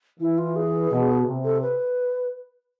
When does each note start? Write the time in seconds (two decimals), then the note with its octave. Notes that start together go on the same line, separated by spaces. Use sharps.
0.20 E3 E4
0.38 F4
0.56 G#4
0.91 B2
1.26 C3
1.44 A4
1.62 B4